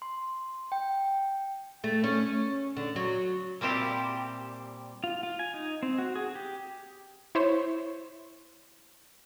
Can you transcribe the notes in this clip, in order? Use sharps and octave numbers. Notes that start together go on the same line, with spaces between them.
C6
G5
A3
C#4
D3
F#3
A#2 G3 C4 E4 G4
F4
F4
G#5
D#4
C4
F#4
G#4
G4
E4 C5 C#5